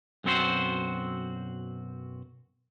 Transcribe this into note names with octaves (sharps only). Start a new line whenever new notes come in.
B1 F#2 C4 F#4 C5